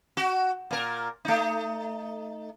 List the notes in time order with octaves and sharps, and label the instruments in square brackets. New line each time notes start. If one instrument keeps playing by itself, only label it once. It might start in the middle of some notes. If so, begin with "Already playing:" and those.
[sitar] F#4
A#2 A#4
A3 D#4